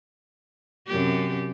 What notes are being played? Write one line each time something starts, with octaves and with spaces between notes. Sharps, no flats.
F#2 C3 G4